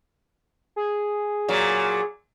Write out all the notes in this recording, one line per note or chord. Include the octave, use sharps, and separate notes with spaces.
G#4
A#2 F#3